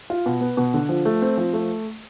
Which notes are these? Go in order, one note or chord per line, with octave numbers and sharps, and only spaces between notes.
F4
B2
B3
B2
D3
F3
A3
C4
F3
A3